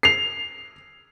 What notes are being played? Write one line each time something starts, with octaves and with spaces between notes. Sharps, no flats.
C7 F7